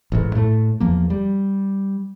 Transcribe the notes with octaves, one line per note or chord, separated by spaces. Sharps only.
A1 G#2
A2 A3
E2 F3 A#3
G3